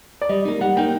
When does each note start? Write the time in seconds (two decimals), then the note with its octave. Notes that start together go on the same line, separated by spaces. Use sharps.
0.21 D5
0.29 G3 D#5
0.45 A#3 D#4
0.61 G3 F#5
0.77 A#3 D#4 G5